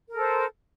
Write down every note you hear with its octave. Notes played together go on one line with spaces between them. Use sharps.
A4 A#4 C5